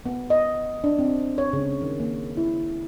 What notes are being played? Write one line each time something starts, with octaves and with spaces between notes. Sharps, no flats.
B3
D#5
D4
C4
C#5
C#3
D#3
A#3
E4